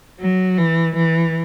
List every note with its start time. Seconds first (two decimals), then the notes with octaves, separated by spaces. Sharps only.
0.20 F#3
0.58 E3
0.96 E3